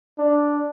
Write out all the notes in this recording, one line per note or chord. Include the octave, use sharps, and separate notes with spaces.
D4